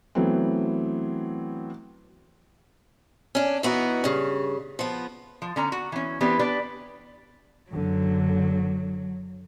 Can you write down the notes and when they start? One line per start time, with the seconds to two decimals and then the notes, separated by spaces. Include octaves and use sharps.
0.15 E3 F#3 A3 B3 C4
3.35 C#4 D4
3.63 E3 B3 D#4 F#4
4.04 G2 C#3
4.79 F3 B3
5.42 F3
5.56 D3 C#4 A#5
5.72 F#4
5.92 E3 C#4
6.21 E3 B3 C4 D4 G4
6.39 D4 G4 B4 D5
7.71 F#1 D3 F#3